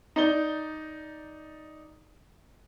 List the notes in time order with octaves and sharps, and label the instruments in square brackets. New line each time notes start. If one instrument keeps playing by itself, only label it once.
[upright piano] D#4 D5 G7